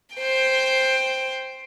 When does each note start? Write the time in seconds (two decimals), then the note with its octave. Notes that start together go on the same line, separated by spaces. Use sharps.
0.16 C5 G5